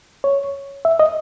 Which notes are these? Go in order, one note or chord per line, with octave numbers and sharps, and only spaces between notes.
C#5
E5
D#5